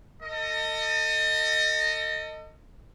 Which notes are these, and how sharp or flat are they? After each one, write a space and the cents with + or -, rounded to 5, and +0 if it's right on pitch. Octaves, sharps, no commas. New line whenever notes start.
A4 +35 D#5 +0